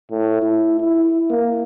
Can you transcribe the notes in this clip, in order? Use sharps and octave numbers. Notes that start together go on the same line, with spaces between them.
A2
E4
E4
A#3